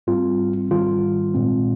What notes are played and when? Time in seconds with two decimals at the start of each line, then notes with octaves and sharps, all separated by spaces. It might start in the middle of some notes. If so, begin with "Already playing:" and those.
0.07 G#2 G3 C4 F4
0.71 G#2 D#3 G3 F4
1.34 A#2 G#3 C4